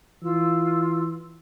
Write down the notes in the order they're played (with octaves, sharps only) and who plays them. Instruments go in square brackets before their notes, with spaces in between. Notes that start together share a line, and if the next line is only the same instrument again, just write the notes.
[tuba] E3 [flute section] F4 E6